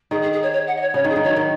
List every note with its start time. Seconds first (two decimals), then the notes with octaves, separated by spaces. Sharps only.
0.11 D#3 G#4
0.21 G#4
0.32 G#4
0.42 C#5
0.52 C#5
0.66 F#5
0.76 D#5
0.81 C#5
0.94 C#3 C#5
1.04 D#3 G#4
1.16 D#3
1.23 C#5
1.26 F#3
1.36 D#3